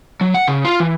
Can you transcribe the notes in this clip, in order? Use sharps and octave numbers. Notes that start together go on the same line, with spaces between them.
F#3
F#5
C#3
F4
E3